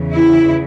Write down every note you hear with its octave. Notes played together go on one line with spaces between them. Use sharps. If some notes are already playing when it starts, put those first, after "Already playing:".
Already playing: E2 C#3 E3
E4